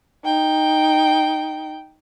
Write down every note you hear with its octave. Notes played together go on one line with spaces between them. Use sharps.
D#4 G5